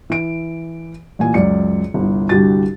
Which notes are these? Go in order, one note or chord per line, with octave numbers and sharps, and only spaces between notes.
E3 D7
A1 A#2 G#5
C#2 F#2 D5 C#7
G1 C2
C2 G2 D3 F#4 G4 A6